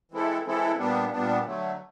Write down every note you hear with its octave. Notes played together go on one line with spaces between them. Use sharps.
E3 G#3 C4 E4 A4
E3 G#3 C4 E4 A4
A#2 G3 B3 D4
A#2 G3 B3 D4
D3 F#3 A3